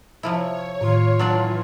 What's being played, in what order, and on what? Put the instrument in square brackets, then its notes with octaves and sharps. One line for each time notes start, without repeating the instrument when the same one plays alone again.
[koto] C3 F3 E4 [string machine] C#5
[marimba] A2 D#3 [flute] F4
[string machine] E3 [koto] F#3 D4 D5